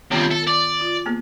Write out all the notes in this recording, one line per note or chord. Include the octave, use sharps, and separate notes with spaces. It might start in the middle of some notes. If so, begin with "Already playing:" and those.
G2 C3 D#3 B3 F4
A4
D5
F4
A#3 B3 G#4